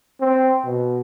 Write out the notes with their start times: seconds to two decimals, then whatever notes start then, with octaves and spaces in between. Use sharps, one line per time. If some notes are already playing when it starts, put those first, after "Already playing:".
0.21 C4
0.65 B2